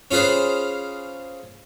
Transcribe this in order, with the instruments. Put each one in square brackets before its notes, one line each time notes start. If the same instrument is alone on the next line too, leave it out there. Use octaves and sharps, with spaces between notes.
[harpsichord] C#4 F4 G#4 B4 C5